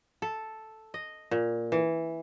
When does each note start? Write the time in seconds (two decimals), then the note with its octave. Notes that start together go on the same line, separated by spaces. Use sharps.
0.22 A4
0.94 D#5
1.31 A#2
1.72 E3